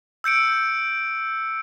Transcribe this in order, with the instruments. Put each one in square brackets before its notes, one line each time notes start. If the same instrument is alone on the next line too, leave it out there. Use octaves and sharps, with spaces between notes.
[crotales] E6 G6 C#7 D7